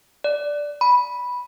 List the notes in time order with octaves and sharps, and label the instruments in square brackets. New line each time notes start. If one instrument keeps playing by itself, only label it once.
[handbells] D5
B5